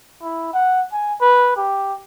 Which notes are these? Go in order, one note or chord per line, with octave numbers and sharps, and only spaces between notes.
E4
F#5
G#5
B4
G4